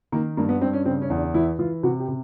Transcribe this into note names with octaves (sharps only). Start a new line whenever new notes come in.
D#3 A#3
G2 A#3
B3
G2 C4
C#4
C#3 C4
C#4
E2
D4
E3 E4
E3 F4
C3 F#4
G4
C3